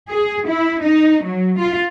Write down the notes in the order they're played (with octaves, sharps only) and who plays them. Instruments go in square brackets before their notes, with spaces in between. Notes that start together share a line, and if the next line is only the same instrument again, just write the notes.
[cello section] G#4
E4
D#4
F#3
F4